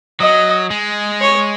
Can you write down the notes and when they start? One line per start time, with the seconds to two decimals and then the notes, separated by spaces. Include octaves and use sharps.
0.20 F#3 D#5
0.71 G#3
1.22 C#5